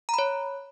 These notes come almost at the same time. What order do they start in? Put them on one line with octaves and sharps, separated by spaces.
A#5 B5 C#5